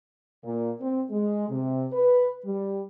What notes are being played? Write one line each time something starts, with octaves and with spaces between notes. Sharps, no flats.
A#2
C4
G#3
C3
B4
G3